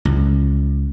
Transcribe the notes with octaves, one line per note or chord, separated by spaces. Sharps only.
C#2